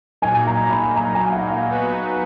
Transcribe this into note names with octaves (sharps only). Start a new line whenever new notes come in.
A#2 F#3 A#3 D#4 G#5
A#5
B5
A#5
G#5
F#5
F5
F#3 B3 D#4 F#4 B4